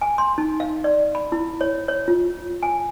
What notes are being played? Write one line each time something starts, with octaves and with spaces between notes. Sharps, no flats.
G#5
C6
D#4
F5
D5
B5
E4
C#5
C#5
F4
G#5